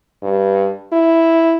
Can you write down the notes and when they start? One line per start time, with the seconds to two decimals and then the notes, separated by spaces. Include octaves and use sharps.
0.23 G2
0.92 E4